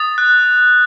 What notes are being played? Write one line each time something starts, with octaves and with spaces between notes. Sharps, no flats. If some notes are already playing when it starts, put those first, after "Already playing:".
Already playing: D#6 A6
F#6